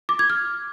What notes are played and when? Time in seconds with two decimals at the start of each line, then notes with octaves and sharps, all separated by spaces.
0.09 D6
0.19 G#6
0.30 F6